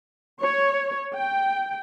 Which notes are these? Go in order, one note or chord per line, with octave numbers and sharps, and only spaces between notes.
C#5
G5